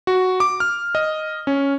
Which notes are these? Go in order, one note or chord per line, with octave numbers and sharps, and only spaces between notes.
F#4
D6
F6
D#5
C#4